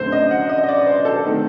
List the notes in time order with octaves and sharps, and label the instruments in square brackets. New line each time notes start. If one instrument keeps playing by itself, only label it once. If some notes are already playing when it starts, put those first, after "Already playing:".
Already playing: [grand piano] F#2 D3 A3 C4 C5
D#5
F#5
D#5
D#5
D5
C5
A4
D#3 A3 C4